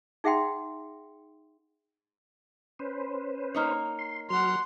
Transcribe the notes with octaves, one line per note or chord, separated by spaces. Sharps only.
D#4 G#4 E5 F#5 G5 C6
C#4 B4 C5
A#3 D#4 C#5
C6
F#3 F#5 C6 F6